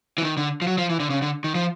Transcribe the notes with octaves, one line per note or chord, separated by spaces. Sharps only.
E3
D#3
D3
F3
F#3
F3
E3
D3
C#3
D3
D#3
F3